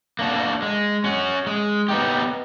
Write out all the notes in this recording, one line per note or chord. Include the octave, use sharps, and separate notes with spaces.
A#3 D4 F#4
G#3
C#4 F#4
G#3
B3 D#4 G4